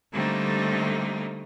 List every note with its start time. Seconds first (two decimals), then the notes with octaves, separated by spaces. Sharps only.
0.12 D3 G3 A3 A#3 C4 D#4